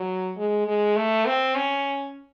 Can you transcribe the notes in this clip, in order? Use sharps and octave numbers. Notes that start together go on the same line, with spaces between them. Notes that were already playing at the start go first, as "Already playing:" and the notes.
Already playing: F#3
G#3
G#3
A3
C4
C#4